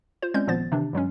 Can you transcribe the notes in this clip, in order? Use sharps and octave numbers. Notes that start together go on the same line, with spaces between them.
F4 C5
G#3 C4 C#4 D5 G6
G#1 A#2 F3 B3 C5 A6
C3 D#3 E3 D4
G2 F#3 G#3 C#4